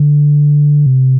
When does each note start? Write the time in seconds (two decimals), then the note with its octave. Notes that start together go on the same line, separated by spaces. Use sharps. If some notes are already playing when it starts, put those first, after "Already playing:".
Already playing: D3
0.86 C3